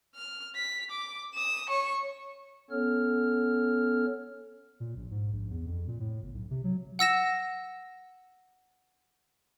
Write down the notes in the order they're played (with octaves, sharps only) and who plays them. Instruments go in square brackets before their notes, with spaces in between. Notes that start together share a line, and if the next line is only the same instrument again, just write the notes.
[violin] F6
B6
D6
D#6 E7
C#5 C#6
[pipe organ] B3 C#4 A4 C#5 F6
[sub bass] A#2
A#1
G#2
A#1
E2
F2
A#2
A2
G1
B1
C3
F#3
[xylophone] F#5 E6 A#6 E7